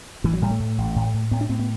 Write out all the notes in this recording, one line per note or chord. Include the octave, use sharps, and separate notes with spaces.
A1 E3
F#3
A2 G3
A3
A2
A1
A2
A2
A2 B3
D4
A2 C4
B3